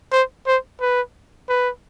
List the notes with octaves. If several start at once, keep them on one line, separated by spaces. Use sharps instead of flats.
C5
C5
B4
B4